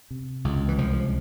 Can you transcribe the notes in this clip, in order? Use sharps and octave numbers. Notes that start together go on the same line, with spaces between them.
C3
C#2
E3
C2 F3